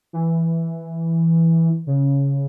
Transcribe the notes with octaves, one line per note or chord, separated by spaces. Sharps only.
E3
C#3